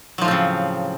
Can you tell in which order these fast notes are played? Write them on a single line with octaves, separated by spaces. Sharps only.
F#3 F3 A2 C4 C#3